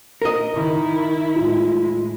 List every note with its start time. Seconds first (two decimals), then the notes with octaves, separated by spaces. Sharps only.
0.22 A#4 D#5
0.54 D#3 E4
1.36 A2 G#3 F4